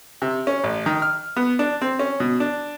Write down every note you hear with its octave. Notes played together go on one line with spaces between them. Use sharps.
C3
C#4
A1
D#3
F6
B3
D4
C4
C#4
B2
D4